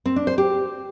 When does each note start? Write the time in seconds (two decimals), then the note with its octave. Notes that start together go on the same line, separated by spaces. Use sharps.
0.06 C4
0.16 D4
0.27 C5
0.38 G4